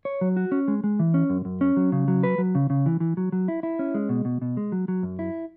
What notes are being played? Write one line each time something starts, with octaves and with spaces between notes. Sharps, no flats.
C#5
F#3
F#4
C#4
G#3
G#3
E3
C#4
F#2
F#2
C#4
F#3
C#3
F#3
B4
F#3
C#3
C#3
E3
E3
F#3
F#3
E4
E4
C#4
G#3
B2
B2
B2
G#3
F#3
F#3
F#2
E4